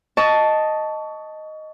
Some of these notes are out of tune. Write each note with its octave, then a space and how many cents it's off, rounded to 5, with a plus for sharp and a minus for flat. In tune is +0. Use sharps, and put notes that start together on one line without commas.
D#5 +0 A5 +0 C#6 +25